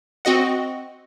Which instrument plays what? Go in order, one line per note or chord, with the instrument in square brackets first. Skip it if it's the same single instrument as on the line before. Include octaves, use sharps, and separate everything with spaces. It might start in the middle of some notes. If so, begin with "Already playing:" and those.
[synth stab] C4 F#4 D#5 F#5